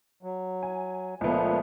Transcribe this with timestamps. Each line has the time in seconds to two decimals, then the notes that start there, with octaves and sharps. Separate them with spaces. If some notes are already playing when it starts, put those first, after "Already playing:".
0.23 F#3
0.63 G#5
1.21 C#2 A#2 F3 A3 B3